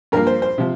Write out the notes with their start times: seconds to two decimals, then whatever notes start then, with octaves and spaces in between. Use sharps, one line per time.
0.12 G2 F3 A#3 A#4
0.27 C5
0.42 C5
0.58 C3 F3